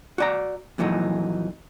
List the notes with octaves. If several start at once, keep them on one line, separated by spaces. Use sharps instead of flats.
F#4 D5 A#5
F2 A#2 E3 F#3 D#4